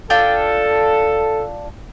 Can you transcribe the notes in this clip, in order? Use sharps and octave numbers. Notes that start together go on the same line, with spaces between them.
D4 F4 A4 G5